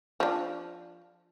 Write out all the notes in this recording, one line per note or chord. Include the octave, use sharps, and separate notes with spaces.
F3 D4